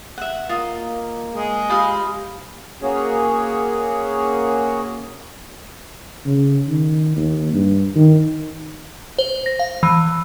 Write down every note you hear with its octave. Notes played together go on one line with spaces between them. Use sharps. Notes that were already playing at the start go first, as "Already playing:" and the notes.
E5 F#5
A#3 F4 D#5
G#3 G#4
F4 G4 D#5 F5 B5
A#3 C#4 F#4 G#4 C#5
C#3
D#3
D#2
G2
D#3
C5
A#6
F5
E3